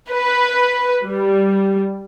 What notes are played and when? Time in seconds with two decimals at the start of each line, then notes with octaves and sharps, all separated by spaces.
0.11 B4
1.04 G3